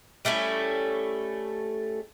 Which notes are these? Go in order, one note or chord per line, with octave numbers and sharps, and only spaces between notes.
G3 A3 C#4 E4